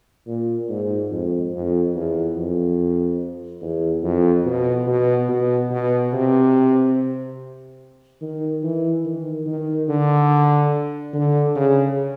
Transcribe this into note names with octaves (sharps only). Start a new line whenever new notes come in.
A#2
G#2
F2
F2
E2
F2
E2
F2
B2
B2
B2
B2
C3
D#3
E3
D#3
D#3
D3
D3
C#3